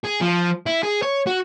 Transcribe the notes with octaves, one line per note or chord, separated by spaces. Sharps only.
G#4
F3
E4
G#4
C#5
F#4